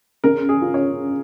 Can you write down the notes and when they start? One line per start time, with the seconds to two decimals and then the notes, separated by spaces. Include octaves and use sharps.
0.24 C#3 A#4
0.49 G#4
0.62 F4
0.74 C#5